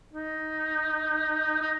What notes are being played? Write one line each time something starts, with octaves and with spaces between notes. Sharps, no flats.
D#4
D#4